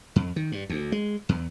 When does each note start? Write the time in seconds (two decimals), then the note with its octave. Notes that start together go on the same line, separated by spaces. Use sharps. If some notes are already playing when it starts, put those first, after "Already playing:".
0.16 F2
0.36 D#3
0.52 G2
0.69 D2
0.92 G#3
1.29 E2